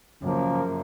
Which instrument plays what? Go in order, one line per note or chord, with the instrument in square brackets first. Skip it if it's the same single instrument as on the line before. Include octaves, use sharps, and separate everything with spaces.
[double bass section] F#2 [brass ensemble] C#3 F3 A#3